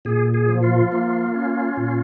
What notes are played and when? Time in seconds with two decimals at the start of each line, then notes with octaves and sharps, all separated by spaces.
0.05 A#2 G#4
0.34 G#4
0.49 F3
0.63 F4
0.92 A#3
1.34 C#4
1.77 A#2